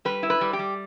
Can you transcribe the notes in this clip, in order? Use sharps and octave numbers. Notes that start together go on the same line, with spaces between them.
G3 B4
E4
B4
G3
G4
G3